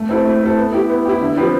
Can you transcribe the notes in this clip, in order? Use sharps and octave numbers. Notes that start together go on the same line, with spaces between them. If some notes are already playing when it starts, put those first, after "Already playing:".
Already playing: A3
C4 E4 A4
A3
C4 E4 A4
B3
E4 G4
B3
E4 G4
D3
F3 C4 G4 B4